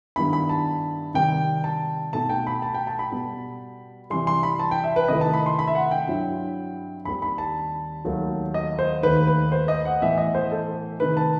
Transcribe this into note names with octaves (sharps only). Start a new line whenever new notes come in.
G2 D#3 G3 B3 E4 B5
B5
A5
C3 D#3 G3 G5
A5
B2 A3 D#4 A5
G5
B5
A5
G5
A5
B5
B2 G3 B3
C3 E3 G3 C6
C6
B5
A5
G5
E5
B4
C3 D#3 A3 E4 D#5
A5
B5
C6
B5
E5
F#5
G5
G2 F#3 C4 E4
D#2 D#3 G3 C4 B5
B5
A5
D#2 D#3 F#3 A3
D#5
C5
D#2 D#3 A3 D#4 B4
B4
C5
D#5
F#5
A2 E3 B3 E5
D#5
C5
A4
C3 D#3 A3 D#4 B4
A5